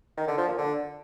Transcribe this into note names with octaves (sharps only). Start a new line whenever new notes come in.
D#3
D3
F3
A#2
D3